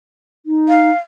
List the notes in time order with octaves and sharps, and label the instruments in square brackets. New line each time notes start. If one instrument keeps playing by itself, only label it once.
[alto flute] D#4
[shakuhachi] F5